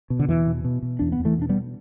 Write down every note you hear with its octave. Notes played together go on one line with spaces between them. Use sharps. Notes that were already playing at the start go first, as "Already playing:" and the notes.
B2
D3
E2 E3
B2
B2
B2
E2 D4
B3
E2
E3 A3
B2 D4
G3 B3